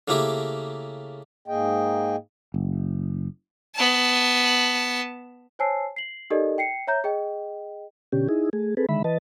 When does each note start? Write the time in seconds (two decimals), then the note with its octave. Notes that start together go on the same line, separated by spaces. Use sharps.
0.08 C#3 A3 A#3 E4 G4
1.48 G#2 A#3 G#4 D#5 G5
2.54 F#1
3.75 B3 A5
5.59 C5 C#5 G#5 A5 E6 C7
5.96 C7 F#7
6.30 D#4 G4 A4 A#4 D5 D#5
6.58 G5 C7 C#7
6.87 C#5 E5 A#5 G6
7.04 G#4 D#5 G5
8.12 B2 D3 C#4 G4
8.29 D#4 E4 G#4
8.53 A3 G#4
8.77 C4 G#4 A4 B4
8.89 D3 D#3 G#3 E5 B5
9.04 E3 B4 D#5 A5